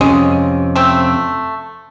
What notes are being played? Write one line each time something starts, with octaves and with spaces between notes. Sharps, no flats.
F2 C3 G#3 C#4
A3 C4